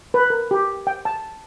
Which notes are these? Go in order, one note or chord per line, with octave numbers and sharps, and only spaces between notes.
B4
A#4
G4
G5
A5